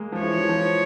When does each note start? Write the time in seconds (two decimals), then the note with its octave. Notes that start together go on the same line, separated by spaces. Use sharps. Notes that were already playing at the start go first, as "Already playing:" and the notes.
Already playing: G#3 A#3
0.12 F3
0.21 E3 C#5
0.39 E3
0.49 F3